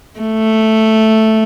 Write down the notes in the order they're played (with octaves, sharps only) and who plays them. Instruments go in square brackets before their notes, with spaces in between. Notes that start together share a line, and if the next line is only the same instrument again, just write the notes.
[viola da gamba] A3